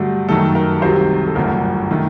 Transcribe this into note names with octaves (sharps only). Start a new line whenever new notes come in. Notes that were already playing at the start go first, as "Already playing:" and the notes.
Already playing: G2 D3 F#3 A3
F#2 D#3 A3 A4
A#4
C2 C3 D#3 F#3 C5
A4
G1 F#2 D3 A3 A#4
D#3 A3